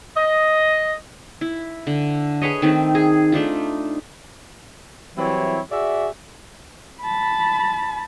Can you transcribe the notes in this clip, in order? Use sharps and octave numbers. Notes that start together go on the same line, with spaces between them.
D#5
E4
D3
G#4 B4 C#5 D#5
D#3 A3 C4 D#4
G#4
A3 D4 D#4 F4
E3 F#3 G3 C4 E4 C#5
F#4 G#4 D5 E5
A5 B5